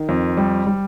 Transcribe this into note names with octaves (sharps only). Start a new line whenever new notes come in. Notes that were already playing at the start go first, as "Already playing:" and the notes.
Already playing: D#3
F2
G3
G3